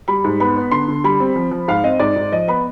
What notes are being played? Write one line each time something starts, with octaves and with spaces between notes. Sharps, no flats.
G3 B5
G#2
B3 B5
B3
D3 C6
D3
G3 B5
C4
F3
F3
G#2 F5
C4 D#5
G#2 D5
G#2
F3 D#5
B3 B5